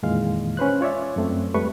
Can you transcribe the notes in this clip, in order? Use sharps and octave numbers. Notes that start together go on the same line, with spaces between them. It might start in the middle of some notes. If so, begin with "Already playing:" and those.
F2 A#2 D#3 E3 G#3 F5
C#4 B4 C5 F#6
F4 C#5 D5 E5
F#2 A3 C4
F2 G3 A3 B4 C#6